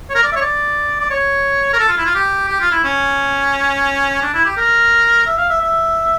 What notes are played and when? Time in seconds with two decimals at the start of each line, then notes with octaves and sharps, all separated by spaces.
0.09 C#5
0.15 A#4
0.23 D5
0.32 E5
0.36 C#5
0.41 D5
1.00 D5
1.10 C#5
1.73 A#4
1.79 A4
1.88 F4
1.97 E4
2.05 F4
2.15 G4
2.48 G4
2.60 F4
2.71 E4
2.84 C#4
4.22 D4
4.34 E4
4.45 G4
4.57 A#4
5.26 E5
5.38 F5
5.49 E5
5.61 E5